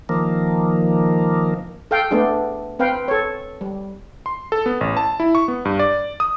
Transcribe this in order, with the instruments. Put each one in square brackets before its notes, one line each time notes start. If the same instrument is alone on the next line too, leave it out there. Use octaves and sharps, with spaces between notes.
[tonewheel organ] D#3 F3 A#3
[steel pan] A4 F5 G5
A3 B3 D4 G#4
C4 B4 F5 G5
A4 C#5
G3
[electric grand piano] C6
A4
B3
A1
A5
E4
C#6
B3
G2
D5
D#6